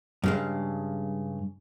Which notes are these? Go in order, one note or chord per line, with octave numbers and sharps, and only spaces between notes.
G2 C#3 G#3